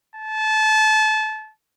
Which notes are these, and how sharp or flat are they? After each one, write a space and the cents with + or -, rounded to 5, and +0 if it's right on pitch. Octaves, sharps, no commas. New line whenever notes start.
A5 -25